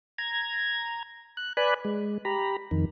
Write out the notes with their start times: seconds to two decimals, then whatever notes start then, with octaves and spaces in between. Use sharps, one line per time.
0.18 A#5 G#6
1.37 F#6
1.57 B4 D5 G#5 B5 F#6
1.85 G#3
2.25 G4 A#5 B5
2.71 F2 D#3